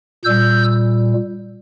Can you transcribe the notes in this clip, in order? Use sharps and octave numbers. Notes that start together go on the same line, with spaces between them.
A#2 G3 E6 G6